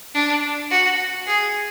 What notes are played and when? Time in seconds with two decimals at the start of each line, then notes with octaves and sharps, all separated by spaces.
0.14 D4
0.70 F#4
1.26 G#4